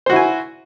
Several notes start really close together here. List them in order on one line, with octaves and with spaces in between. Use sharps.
C5 F#4 E4 G#5